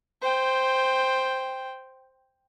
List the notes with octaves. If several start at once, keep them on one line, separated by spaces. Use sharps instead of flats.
C5 G5